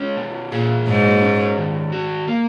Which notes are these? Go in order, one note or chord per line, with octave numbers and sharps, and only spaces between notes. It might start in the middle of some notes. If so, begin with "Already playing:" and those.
Already playing: G#3 C#4
B2
A#2 G#4
G#2 F#3
C#4
D#3
F#4
A#3